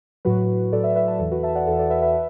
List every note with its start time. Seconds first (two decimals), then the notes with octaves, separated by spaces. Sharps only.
0.25 A2 F#3 F#4 B4
0.72 A2 F#3 A4 D5
0.84 B4 E5
0.96 B4 E5
1.08 E5 A5
1.19 E2 E3 A4
1.31 F#4 B4
1.43 E5 A5
1.55 D5 F#5
1.67 E2 E3 A4
1.79 A4 D5
1.90 B4 E5
2.02 B4 E5